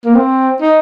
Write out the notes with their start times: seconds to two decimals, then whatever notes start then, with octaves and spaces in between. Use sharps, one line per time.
0.05 A#3
0.15 C4
0.62 D#4